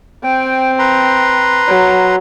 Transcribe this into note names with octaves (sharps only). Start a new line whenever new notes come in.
C4 G5
B4 A#5 C6
F#3